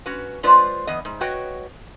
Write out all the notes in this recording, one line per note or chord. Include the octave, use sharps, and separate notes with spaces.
C#4 F#4 B4
G#3 F4 B4 C5 D5
E2 B3 D#5
G#2
F#4 B4 C#5 D#5 G5